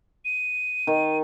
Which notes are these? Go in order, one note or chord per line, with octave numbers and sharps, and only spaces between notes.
D#7
D#3